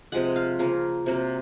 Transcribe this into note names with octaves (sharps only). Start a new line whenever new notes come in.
C3 F3 G#3 F#5
F5
C#3 F3 A#3
C3 F#3 A#3